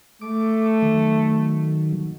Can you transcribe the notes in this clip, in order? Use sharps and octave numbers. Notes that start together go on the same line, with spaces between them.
A3 D6
D#3 F#3